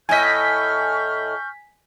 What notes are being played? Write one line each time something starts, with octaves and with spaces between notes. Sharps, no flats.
A2 D#5 G#5 C#6 F6 G6 B6